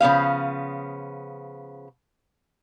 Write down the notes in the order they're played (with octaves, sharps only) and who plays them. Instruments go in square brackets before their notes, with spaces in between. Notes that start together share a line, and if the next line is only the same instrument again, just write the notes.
[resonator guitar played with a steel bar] C#3 F3 B3 F5